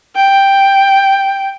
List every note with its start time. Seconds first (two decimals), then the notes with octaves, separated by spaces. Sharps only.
0.16 G5